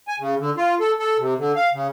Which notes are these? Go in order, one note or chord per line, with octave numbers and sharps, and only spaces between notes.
G#5
C#3
D3
F4
A4
A4
C3
D3
F5
C#3